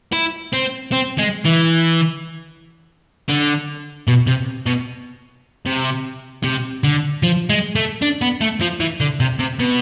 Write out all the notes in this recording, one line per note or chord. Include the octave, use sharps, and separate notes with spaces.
E4
C4
C4
G#3
E3
D3
B2
C3
B2
C3
C3
D3
F3
G#3
A3
D4
B3
A3
F3
E3
D3
C3
C3
B2